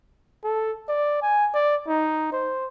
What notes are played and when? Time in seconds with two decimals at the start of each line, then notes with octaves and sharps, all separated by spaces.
0.44 A4
0.89 D5
1.22 G#5
1.54 D5
1.88 D#4
2.32 C5